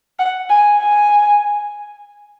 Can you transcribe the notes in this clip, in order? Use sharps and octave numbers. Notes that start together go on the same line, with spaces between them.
F#5
G#5
G#5